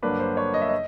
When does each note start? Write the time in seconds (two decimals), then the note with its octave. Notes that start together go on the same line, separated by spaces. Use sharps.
0.02 G2 D3 F#3 A#3 D4 B4
0.20 C5
0.37 C#5
0.54 D#5
0.62 E5
0.69 D#5